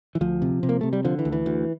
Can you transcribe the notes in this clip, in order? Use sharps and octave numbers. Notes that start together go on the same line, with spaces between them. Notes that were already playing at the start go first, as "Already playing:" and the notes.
E3
D2 F3
C3
C3
A#3
C3 A3
G3
D3 F3
E3
D2
E3
D2